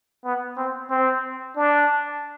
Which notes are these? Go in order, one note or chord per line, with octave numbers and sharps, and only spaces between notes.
B3
C4
C4
D4